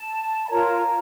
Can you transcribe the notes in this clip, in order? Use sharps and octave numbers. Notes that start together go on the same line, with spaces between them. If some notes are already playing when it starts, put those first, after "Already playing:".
Already playing: A5
B5
F4 A#4 C#5 A#5